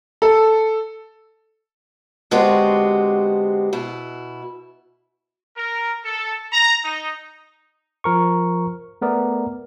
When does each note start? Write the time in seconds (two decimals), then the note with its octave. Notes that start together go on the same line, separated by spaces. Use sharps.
0.22 A4
2.31 D3 G#3 B3 C4 F#4 G4
3.73 B2 E4
5.56 A#4
6.05 A4
6.53 A#5
6.84 D#4
8.04 F3 A#4 C#6
9.02 A3 B3 A#4 D5